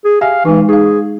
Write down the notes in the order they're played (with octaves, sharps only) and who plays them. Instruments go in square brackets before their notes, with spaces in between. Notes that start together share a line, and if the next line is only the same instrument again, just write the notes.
[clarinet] G#4
[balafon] G4 E5 G#5 [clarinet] F5
[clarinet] E3 [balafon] G#3 D#4
[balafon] D#4 F5 [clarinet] G#4